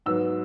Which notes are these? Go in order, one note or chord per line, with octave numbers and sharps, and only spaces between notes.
G#2 F#3 B3 E6